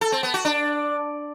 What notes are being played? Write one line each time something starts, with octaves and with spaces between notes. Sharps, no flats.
A4
C4
B3
F#4
D4